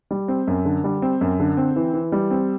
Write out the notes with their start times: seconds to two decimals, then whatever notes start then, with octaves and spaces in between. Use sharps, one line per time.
0.11 G3
0.28 C4
0.47 F#2
0.65 D3
0.84 G3
1.02 C4
1.21 F#2
1.40 D3
1.57 C4
1.76 E3
1.94 E3
2.12 G3
2.31 C4